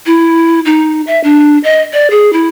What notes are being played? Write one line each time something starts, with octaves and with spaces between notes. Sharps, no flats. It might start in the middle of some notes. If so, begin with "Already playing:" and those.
E4
D#4
E5
D4
D#5
D5
G#4
E4